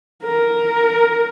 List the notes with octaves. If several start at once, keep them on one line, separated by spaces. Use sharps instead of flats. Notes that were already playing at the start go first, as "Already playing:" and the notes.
A#4